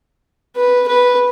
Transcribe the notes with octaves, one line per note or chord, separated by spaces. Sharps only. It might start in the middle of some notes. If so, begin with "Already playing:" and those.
B4
B4